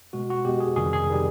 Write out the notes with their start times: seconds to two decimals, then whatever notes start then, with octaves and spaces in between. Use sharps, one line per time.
0.13 B2 G#3 F#4
0.30 F#4
0.45 B2 G#3 G4
0.60 G#4
0.76 F2 C3 D#3 G3 G#4
0.93 G#4
1.10 C3 D#3 G3